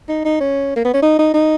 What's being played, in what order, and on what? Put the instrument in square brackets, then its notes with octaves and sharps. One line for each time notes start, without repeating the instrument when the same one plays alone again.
[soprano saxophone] D#4
D#4
C#4
A#3
B3
C#4
D#4
D#4
D#4